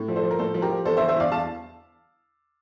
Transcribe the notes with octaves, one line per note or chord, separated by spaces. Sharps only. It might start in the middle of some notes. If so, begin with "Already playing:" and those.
Already playing: A2
F3
A4 C5
F3
A#4
A2 A4 C5
F3
G4 A#4
F3
E2 A4 C5
C5 E5
E2
C5 E5
E2 D5 F5
E2 F5 A5